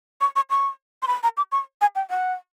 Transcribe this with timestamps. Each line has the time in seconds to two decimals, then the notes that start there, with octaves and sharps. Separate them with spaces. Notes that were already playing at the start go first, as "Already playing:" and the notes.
0.21 C#6
0.36 C#6
0.50 C#6
1.02 C6
1.07 B5
1.23 A#5
1.37 D6
1.52 C#6
1.81 G#5
1.95 G5
2.10 F#5